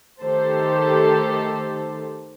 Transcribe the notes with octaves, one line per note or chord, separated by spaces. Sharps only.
D#3 A3 G4 A4 C5